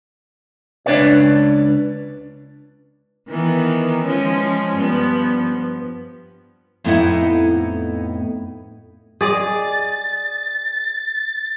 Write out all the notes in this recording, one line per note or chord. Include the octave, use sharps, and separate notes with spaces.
C#2 D4 D#4 B4 C#5 D5
D#3 E3 B3
F3 G#3 C#4
G2 F3 B3
F2 A2 B3 D#4 E4 F#5
G#4 D5 D#5 A6